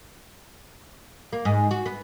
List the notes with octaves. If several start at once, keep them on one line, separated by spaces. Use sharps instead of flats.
A#3
G#2
F#4
B3